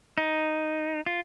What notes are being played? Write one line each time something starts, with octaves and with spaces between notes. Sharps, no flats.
D#4
F4